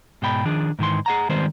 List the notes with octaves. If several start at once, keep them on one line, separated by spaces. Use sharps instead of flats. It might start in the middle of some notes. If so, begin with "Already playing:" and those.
G#2 B2 G5 B5
D#3 F3 D4 G#4
G#2 D#3 E3 C6
G#4 F#5 A#5
D#3 G3 G#3 B3 C4 C5